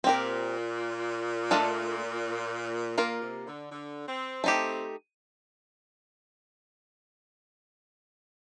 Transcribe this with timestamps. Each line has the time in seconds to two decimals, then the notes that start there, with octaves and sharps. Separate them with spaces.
0.04 A#2 C4 G4 A#4
1.51 A3 D4 F4 A4 D#5
2.98 A#2 A#3 F4 A#4
3.21 C3
3.46 D3
3.70 D3
4.07 C4
4.44 A3 C4 D#4 G4